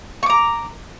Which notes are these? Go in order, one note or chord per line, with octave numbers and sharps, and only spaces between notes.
A#5 C#6 D6